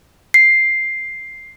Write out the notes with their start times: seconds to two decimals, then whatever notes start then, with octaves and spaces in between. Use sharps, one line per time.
0.34 C7